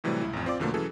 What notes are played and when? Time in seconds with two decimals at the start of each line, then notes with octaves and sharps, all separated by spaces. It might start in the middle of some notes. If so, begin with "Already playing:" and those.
0.04 A2 C3 E3 F#3 G3 A3
0.21 C#2 E4
0.33 A1 F2
0.46 C4 F4 D5 D6
0.59 E2 B2 D3 F3 A3 A#3
0.74 E3 F#3 C#4 G#4 A4